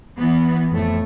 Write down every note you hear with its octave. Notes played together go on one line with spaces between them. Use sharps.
E3 B3
F2 A2 A3